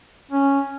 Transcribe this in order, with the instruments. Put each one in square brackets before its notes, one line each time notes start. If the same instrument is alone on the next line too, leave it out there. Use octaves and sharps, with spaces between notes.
[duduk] C#4